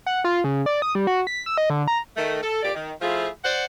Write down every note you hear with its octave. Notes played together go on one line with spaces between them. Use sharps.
F#5
F4
C#3
D5
D#6
G3
F#4
B6
E6
D#5
D3
A#5
D#3 A3
A4
F2 A#2 G4 D5
D#3
F3 A3 E4 F4 G#4
C5 D5 F#5